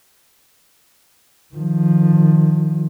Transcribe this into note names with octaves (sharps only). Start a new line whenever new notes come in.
D#3 F3